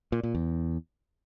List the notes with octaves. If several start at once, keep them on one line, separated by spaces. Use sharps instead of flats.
A#2
A#2
E2